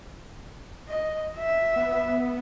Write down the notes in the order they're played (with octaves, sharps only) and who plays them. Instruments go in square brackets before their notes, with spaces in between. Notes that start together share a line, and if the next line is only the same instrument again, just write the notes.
[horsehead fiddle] D#5
E5
[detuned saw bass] B3